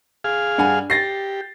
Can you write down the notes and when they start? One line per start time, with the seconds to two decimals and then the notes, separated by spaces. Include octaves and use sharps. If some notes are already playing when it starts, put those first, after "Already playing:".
0.24 G#4 F5
0.58 G2 F#5 G#5
0.90 G4 A6 A#6 C7